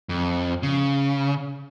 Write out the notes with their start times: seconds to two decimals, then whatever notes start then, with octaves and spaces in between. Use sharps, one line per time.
0.09 F2
0.63 C#3